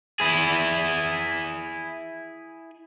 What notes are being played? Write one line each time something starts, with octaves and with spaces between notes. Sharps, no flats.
E4 G#4